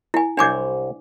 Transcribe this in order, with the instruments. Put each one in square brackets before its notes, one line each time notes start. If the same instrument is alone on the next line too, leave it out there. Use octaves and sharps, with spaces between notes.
[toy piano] E4 G#5
[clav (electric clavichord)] C2 C5 C#5 [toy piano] D4 G#5 D6